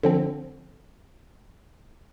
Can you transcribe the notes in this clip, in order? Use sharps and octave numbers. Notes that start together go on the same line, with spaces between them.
D3 F3 C4